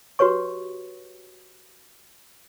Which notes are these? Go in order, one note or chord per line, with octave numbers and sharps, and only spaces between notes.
F#4 G4 B4 C#5 C#6